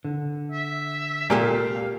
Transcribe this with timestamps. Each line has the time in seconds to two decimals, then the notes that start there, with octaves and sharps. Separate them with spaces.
0.05 D3
0.51 E5
1.30 C2 A#2 G4 A4 F5